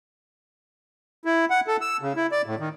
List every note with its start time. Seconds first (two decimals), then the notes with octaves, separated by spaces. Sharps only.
1.25 E4
1.50 F#5
1.67 A4
1.81 E6
2.01 C#3
2.16 E4
2.32 D5
2.46 A2
2.60 D#3